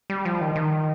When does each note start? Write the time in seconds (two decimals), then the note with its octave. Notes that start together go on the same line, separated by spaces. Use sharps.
0.10 G3
0.25 F3
0.41 D#3
0.55 D#3